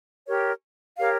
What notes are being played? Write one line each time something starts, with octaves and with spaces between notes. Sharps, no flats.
G4 A#4 C#5
G4 A#4 C#5 F5